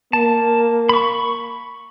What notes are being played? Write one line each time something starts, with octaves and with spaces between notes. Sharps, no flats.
A#3 A5
B5 C#6